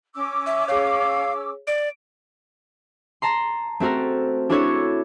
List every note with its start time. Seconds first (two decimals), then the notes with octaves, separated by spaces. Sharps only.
0.15 C#4 D6 E6
0.46 E5
0.68 G#4 C#5 F5
1.67 D5 D7
3.22 A5 A#5 C6
3.80 A3 C4 F#4 A4 A#4
4.50 D4 E4 F#4 A4 C#5 C#6